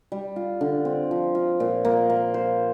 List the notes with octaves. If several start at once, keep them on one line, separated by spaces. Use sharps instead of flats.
G3
F4
D3
C4
F3
F4
A#2
A#3
A#3
C5